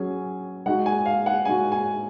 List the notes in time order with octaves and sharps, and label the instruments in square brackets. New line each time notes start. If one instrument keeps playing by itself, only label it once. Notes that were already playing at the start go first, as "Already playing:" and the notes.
Already playing: [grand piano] F#3 C#4 G#4 [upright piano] G#5
[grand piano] G#3 D#4 F#4 [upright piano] F#5
[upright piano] G#5
F5
F#5
[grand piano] G#3 D#4 F#4 [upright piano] G#5
[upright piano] G#5